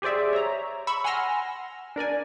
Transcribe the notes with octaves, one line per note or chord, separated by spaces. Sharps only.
G4 G#4 C5 D5 E5
C#5 E5 A#5
B5 C#6 E6
F#5 G#5 C6 E6 F6 A#6
D4 A#4 D5 G#5